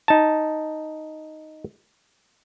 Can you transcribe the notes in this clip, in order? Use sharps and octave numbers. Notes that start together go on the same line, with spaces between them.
D#4 A5